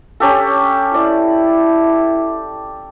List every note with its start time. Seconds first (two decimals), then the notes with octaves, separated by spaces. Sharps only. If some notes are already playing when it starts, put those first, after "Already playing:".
0.20 C#4 G4 A4
0.94 E4 D5